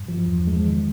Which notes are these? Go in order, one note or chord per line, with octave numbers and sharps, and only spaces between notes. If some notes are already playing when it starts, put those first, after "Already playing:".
Already playing: G2
F3
E2
G#3
D#3